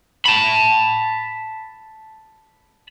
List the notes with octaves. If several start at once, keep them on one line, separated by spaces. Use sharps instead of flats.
A5 B5